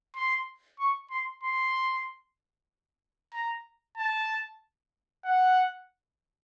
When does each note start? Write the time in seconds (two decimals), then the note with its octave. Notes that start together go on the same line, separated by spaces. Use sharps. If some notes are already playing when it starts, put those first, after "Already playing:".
0.16 C6
0.79 C#6
1.11 C6
1.43 C6
3.34 A#5
3.97 A5
5.25 F#5